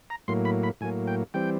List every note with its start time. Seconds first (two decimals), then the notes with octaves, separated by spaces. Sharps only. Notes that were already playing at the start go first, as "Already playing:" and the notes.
0.10 A#5
0.28 A2 F#3 A#3 C6
0.45 B5
0.63 B5
0.81 A2 F#3 A#3 G#5
1.07 G5
1.34 E3 G3 C4 G5